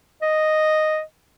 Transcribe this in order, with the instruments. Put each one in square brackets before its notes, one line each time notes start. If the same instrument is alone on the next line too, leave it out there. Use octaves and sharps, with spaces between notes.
[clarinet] D#5